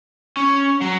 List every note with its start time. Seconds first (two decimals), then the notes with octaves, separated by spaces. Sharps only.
0.37 C#4
0.81 F#3